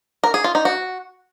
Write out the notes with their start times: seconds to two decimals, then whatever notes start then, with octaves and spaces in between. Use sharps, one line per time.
0.24 A#4
0.34 G#4
0.44 F4
0.55 D#4
0.65 F#4